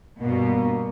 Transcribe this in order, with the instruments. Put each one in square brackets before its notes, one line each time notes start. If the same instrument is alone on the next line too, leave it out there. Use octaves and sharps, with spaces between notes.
[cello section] G2 B2 [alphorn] A#3